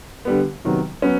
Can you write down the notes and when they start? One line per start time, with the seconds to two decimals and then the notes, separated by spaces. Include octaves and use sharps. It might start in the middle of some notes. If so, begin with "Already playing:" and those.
0.25 D3 G3 B3
0.64 C3 D#3 F#3 B3
1.02 F#3 B3 C#4